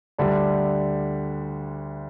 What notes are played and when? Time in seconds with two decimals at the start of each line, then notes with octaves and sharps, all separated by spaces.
0.18 D2 D3 G3 D4